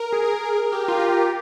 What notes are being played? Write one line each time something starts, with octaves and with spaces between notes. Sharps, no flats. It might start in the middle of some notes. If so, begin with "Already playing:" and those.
Already playing: A#4
G#4
A#4
G#4
A#4
G4
F4
G4
F4
G4